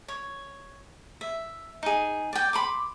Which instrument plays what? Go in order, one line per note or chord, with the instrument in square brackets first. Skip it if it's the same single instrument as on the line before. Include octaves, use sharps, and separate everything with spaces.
[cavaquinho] C#5
E5
D#4 G#4
D5 G5
B5 C6 D6